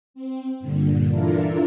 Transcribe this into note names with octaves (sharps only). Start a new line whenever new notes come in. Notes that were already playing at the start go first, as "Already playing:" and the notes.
C4
G2 A#2 D3
E3 D4 E4 F4 A4 A#4